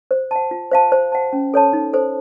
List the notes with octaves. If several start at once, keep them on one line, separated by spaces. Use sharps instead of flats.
C5
F#5 A5
F4
C5 F5 A5
C5
F#5 A5
C#4
A4 C#5 A5
D#4
A4 C5